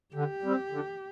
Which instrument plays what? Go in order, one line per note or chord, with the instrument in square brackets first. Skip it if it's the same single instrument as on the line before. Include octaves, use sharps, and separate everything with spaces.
[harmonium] D3 [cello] G4
[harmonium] G3 C4
D3